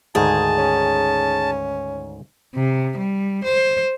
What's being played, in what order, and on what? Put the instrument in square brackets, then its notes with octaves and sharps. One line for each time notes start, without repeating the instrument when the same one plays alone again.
[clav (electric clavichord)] D2 G#2 D#3 [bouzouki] G#4 [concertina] A5
[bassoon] C#4
[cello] C3
G3
C5